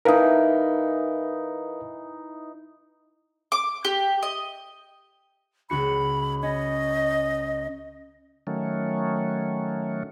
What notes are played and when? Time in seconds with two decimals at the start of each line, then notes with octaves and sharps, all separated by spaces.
0.05 E3 D#4 A#4 B4 F5
3.52 D6
3.85 G4
4.23 D#5
5.70 C#2 F#4 B5 C#7
6.43 C#4 D#5
8.47 D#3 F#3 A3 C#4